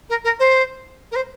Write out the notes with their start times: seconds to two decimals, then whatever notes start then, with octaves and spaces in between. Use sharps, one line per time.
0.09 A#4
0.24 A#4
0.39 C5
1.11 A#4
1.15 C5